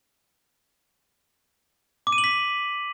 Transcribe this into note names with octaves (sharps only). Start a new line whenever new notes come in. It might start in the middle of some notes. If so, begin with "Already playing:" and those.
D6
D#7
F#7
B6